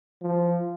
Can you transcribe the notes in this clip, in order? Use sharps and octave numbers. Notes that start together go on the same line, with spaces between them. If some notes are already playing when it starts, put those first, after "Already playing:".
F3